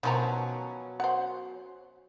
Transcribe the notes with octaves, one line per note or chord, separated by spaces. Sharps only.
B2 D#3 F3 F#3 C#4 A#5
C5 F#5